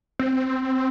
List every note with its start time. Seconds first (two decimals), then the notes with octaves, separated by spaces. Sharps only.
0.19 C4